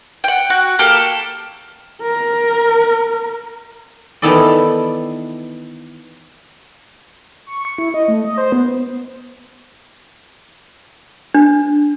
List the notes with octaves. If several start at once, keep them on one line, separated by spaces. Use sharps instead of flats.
F#5 G5
F#4
A#3 G4 A4 A#4
A#4
D#3 E3 B3 E4 A4 D5
C#6
C#7
E4
D#5
A3
D#5
C5
B3
D4